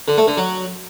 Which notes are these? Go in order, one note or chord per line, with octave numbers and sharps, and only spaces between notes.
D3
A3
D3
F#3